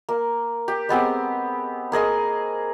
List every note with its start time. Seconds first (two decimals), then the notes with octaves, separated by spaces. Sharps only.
0.09 A#3
0.68 G4
0.89 G#3 B3 C4 G4
1.92 A#3 G#4 D#5 C6